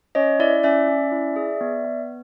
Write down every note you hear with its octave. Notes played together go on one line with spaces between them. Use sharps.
C#4 C#5 D#5
E4 D5 E5
C#4 D5 E5
C#4
E4
G#4
B3
B3